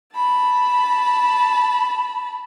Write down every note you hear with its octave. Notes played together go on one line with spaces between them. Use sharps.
A5 B5